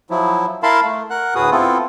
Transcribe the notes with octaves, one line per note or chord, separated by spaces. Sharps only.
F3 F#3 E4
E4 A#4 F5 A5 B5 C6
A3
A#4 F#5 F#6
D2 A2 F#4 G#4 B4 D#6
B3 C4 E4 F4 A4